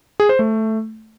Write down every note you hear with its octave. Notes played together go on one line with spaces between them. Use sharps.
G#4
C5
A3